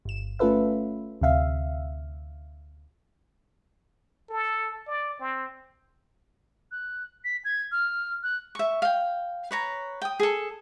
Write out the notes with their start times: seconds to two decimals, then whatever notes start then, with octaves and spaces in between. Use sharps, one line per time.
0.05 G1 E7
0.39 A3 C#4 F4 A4 B4 E5
1.21 D2 C3 E5 F5
4.29 A4
4.87 D5
5.20 C4
6.72 F#6
7.24 B6
7.45 G#6
7.72 F6
8.23 F#6
8.55 E5 C#6
8.82 F5 G5
9.51 B4 C#5 A#5
10.02 G5 D#6
10.20 G#4 A4